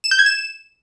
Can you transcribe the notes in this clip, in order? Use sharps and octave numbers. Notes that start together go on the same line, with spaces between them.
E7
G6
G#6
E7